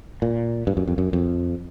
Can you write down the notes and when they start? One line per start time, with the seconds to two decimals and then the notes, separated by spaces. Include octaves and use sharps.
0.22 A#2
0.67 G2
0.77 F#2
0.88 F2
0.98 F#2
1.13 F2